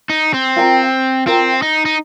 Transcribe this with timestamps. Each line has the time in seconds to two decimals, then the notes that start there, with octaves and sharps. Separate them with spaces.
0.10 D#4
0.34 C4
0.56 F4 A#4 G5
1.26 C4 F4 A#4 G5
1.62 D#4
1.85 D#4